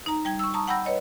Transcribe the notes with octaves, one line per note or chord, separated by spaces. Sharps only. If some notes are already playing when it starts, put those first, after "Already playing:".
D#4 A#5
G3 G5 G#6
C#6 E6
A5 A#5 C#6 D#6
F#5 G5 B5 E6 G6 A#6
B4 C#5 D#5